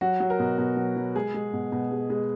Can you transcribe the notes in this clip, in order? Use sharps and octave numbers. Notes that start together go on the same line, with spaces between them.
F#3 F#4
F#3
A#4
B2
B2
F#3
F#3
G#3 G#4
G#3
B2
B2
G#3
G#3